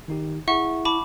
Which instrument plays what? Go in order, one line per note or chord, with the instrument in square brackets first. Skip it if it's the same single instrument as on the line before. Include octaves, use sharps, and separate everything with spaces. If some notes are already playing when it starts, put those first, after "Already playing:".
[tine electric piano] D#3 D#4 G4
[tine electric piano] E4 G#4 [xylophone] E5 F#5 C#6
[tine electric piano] E4 [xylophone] A5 B5 D6